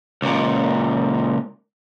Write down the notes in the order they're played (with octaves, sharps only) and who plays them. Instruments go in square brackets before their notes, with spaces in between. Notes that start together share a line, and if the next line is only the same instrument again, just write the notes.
[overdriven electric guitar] C#2 A#2